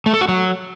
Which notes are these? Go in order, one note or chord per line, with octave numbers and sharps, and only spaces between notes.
A3
A4
F#4
F#3